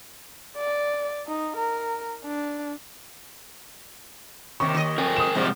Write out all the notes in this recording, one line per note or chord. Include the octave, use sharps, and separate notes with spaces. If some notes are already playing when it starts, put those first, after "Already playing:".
D5
D#4
A#4
D4
D#2 C3 D#3 C#6
D#2 D#5
F2 A#4 G5 G#5
D#6 E7
G#2 C3 F3 G3 G#3 C4